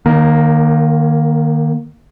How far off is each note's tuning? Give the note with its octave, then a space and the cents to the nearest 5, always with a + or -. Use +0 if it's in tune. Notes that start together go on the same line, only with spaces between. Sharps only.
D#3 -25 A#3 +10